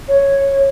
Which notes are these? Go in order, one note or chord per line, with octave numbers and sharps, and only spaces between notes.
C#5